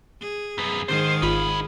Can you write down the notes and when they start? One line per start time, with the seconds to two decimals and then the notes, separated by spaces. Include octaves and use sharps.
0.20 G#4
0.58 F#2 B3
0.88 G#2 D#3 G#4 C5
1.22 G#1 D#4 F4 B5